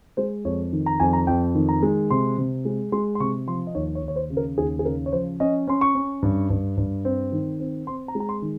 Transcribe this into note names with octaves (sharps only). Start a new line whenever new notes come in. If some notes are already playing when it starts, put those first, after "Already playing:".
G#3 C5
F2 C#5
D#3
A#5
F2 G#5
A#5
F2 G5
D#3
A#5
G#3
C3 C6
C3
G#3
G#3 C6
C6
C3 C#6
F3 C6
D#5
D#2 C#5
C#5
D#2
C#5
C5
C#3
A#4
D#2 G#4
G#4
C#3 A#4
C#5
F3 C5
C#4 D#5
C#4 C6
C#6
C#4
G2
G2
G2
C4
D#3
C4
C4 C6
A#5
G#3
A#5
C6
D#3